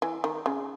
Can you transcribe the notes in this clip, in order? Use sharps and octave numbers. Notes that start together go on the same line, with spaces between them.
E3
D#3
C#3